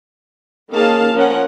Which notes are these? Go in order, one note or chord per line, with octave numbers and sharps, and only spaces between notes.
D#3 A#3 C#4 G#4 F5 A5
F3 C#4 A#4 F#5